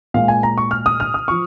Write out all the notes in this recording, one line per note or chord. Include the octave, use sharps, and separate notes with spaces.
A#2 G#3 F5
G#5
A#5
C#6
F6
D#6
F6
D#6
F3 C#6